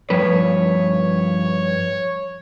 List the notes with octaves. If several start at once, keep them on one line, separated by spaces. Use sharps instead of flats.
G2 F3 B4 C#5